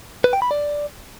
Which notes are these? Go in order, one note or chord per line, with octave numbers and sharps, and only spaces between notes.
B4
G5
B5
D5